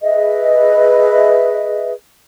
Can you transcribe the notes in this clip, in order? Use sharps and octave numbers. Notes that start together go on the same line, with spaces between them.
G#4 B4 D#5 E5